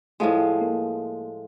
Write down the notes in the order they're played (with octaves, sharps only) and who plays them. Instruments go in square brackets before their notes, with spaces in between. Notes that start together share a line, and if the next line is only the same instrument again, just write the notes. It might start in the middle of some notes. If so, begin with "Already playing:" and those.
[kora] A2 F3 G#3 [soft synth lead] A3
[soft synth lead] A#3